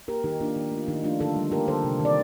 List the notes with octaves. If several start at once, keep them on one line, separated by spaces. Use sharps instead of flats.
A#3 G4 A#4
D#3 D#4 G4
A#3 D4 F4
D#3
A3
F4
D#3 D#4 G4
A3 D4 F4
D3 F4 A4
G3
A#3 G4 A#4
D3 A4 C5
C3
D#3
D5